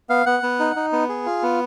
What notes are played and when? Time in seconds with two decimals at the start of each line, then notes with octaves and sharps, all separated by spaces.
0.10 B3 F5
0.26 B3 F#5
0.43 B3
0.60 D#4
0.76 D#4
0.93 B3
1.09 G#4
1.26 F4
1.43 B3